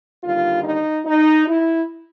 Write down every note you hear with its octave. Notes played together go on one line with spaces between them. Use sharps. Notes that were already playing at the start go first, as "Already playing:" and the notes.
D#2 D3 G3 F4
D#4
D#4
E4